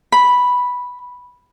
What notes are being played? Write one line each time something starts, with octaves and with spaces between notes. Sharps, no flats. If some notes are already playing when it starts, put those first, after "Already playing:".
B5